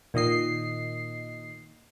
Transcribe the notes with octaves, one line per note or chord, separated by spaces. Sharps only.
A#2 D#3 D#5 C7